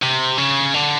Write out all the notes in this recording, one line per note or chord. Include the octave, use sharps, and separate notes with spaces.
C3
C#3
D3